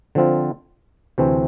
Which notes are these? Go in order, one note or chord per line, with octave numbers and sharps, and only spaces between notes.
D3 F3 C4 F4
D2 C3 E3 A3 C4